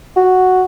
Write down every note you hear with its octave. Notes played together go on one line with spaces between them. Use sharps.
F#4